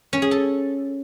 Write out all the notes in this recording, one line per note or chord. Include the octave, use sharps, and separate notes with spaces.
C#4
G#4
A4